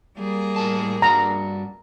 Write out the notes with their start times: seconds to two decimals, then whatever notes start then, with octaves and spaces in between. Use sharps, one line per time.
0.18 G3 A#3 G#4
0.56 A2 A#4 A5
1.02 G2 D4 F#4 A#5